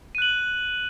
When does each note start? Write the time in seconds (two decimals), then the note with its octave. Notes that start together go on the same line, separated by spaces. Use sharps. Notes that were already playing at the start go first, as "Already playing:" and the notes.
0.15 D#7
0.18 F#6
0.22 F#7